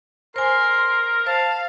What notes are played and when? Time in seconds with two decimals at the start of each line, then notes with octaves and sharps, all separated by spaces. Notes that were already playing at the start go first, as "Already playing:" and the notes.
0.36 A#4 C5 G#5 C6
1.27 C5 F5 A5